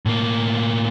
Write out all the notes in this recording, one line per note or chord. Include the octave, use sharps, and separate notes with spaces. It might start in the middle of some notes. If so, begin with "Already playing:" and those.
A2 A#3